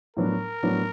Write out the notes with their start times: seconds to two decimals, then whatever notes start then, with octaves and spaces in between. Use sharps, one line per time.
0.16 A2 F#3 B3 D4 A#4
0.63 A2 F#3 B3 D4